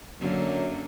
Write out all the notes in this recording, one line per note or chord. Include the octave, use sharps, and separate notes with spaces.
F#2 D3 F#3 A#3